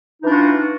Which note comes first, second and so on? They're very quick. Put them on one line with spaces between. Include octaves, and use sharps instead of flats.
D#4 E3 D4 F4 F#4